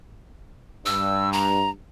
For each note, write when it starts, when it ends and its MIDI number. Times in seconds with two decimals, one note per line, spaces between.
0.86 1.70 43
0.86 1.30 88
1.33 1.70 82